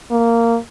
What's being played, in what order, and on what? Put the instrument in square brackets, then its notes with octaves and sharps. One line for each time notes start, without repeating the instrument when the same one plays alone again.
[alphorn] A#3